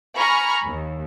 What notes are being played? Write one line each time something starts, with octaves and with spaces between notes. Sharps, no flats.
G#5 A#5 B5 C#6 F6
D#2